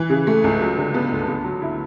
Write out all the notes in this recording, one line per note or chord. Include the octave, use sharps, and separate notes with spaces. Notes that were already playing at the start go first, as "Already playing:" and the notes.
Already playing: E3
C#3
A3
C#2
F#3
D3
B3
D2
B3
F#3
E4